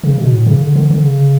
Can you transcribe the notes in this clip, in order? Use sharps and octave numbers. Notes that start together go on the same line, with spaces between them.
C#3
B2
A2
C#3
D3
D3
D3
C#3